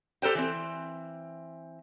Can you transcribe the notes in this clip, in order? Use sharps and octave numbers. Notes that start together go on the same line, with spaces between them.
G4 A4 A#4 C5 G5
E3 C4